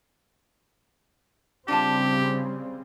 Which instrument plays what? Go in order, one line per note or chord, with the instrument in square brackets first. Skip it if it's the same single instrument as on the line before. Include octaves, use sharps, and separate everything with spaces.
[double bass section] C#3 G3 C4 [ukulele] D4 F4 A5 [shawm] G4